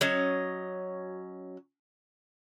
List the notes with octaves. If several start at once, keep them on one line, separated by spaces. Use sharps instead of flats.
F#3 C#4 D#5